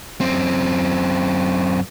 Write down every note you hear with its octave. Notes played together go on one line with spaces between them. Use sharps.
F#2 C4